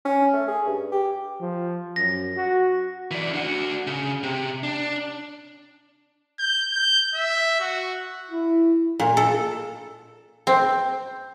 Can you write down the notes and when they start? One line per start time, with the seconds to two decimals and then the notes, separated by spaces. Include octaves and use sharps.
0.05 C#4
0.33 A3
0.48 G#4
0.67 G2
0.92 G4
1.40 F3
1.96 F#2 A#6
2.36 F#4
3.11 E3 D5
3.34 D4 F#4
3.87 C#3
4.23 C3
4.63 D4
6.39 G6
6.72 G6
7.15 E5
7.60 F#4
8.30 E4
8.99 A#2
9.17 A4
10.47 C4